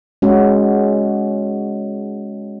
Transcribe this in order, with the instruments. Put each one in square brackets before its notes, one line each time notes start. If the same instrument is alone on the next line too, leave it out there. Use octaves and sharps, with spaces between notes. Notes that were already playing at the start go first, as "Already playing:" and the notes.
[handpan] G#3 C#4 F#4